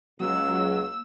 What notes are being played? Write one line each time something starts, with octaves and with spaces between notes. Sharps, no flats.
C#2 F#3 A#3 E6